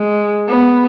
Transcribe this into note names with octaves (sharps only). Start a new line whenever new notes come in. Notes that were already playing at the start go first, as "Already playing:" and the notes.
Already playing: G#3
B3